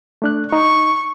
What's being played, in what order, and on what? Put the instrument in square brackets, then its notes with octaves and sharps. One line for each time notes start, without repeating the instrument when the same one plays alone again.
[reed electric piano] A3 D4 F#6
[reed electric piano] D#4 [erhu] C#6